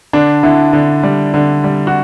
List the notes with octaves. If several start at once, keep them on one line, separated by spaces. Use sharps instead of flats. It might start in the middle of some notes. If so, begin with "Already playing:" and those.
D3 D4
D3 E4
D3
G3
D3
G3
F#4